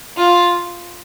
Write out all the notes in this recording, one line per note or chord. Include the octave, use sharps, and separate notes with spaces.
F4